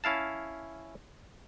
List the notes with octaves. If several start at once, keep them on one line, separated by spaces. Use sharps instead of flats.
C#4 E4 F5 A5